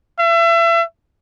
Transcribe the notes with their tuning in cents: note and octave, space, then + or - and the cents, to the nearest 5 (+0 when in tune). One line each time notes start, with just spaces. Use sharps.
E5 +35